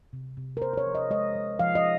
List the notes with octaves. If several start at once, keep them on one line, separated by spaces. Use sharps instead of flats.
C3
C3
A#4
C3 C5
C5
C#5
F3
D#5
G#3 D#5
G#3
F3 F5
D#5